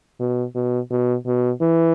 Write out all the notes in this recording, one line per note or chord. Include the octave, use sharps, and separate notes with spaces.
B2
B2
B2
B2
E3